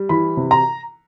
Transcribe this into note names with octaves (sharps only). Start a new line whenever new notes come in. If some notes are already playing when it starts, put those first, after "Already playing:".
Already playing: G3
E3 B5
C3
A#5